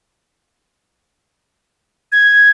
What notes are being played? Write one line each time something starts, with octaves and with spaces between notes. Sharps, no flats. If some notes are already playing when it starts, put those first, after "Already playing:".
G#6